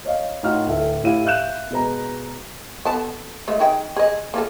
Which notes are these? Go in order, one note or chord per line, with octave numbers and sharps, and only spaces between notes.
C#5 D#5 F5
A2 D#4 F4 F#4 F6
D1 A3 E5
A2 E4 G4 F5 D#7
E5 F5 F#6 G6 E7
B2 G#3 B4 A#5
B3 A4 A5
G#3 A3 F4
D#4 G#4 G5
G#4 D#5
A#3 F4 A4